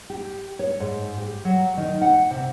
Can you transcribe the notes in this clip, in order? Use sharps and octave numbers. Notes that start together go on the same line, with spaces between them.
G4
C#5
G#2
G4
F#3
D#3
F#5
C3